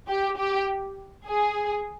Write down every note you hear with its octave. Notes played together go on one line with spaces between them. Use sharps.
G4
G4
G#4